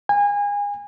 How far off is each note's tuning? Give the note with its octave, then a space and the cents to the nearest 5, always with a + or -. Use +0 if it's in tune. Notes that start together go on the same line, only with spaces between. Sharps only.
G#5 -30